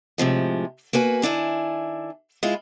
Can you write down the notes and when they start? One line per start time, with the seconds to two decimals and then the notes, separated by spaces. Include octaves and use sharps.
0.18 A2 C3 F3 G#3
0.93 A#3 F#4 B4 G#5
1.22 D#3 D4 E4 G#5
2.43 G#3 E4 F4